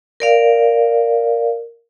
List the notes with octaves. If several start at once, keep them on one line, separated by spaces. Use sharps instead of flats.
A#4 D5 F5